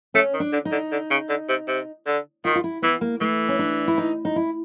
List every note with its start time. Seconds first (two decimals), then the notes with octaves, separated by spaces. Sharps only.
0.14 A3 C#4
0.34 D#3
0.40 D4
0.53 D3
0.65 D#4
0.72 D3
0.92 D3
1.10 C#3
1.29 D3
1.49 C3
1.67 C3
2.07 D3
2.45 D#3 F4
2.55 F4
2.64 E4
2.82 E3 B3
3.01 A#3
3.21 E3 A3
3.49 C#4
3.59 D4
3.88 E4
3.98 D#4
4.25 D#4
4.36 E4